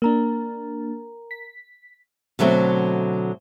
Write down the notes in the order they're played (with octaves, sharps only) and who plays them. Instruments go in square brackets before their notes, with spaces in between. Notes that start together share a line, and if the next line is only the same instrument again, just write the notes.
[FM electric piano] A#3 D4 [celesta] A#4 A#5
[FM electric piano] B6
[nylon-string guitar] B2 D3 F#3 A3 C4